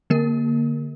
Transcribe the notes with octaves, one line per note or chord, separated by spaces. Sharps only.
D3 A#3 A#4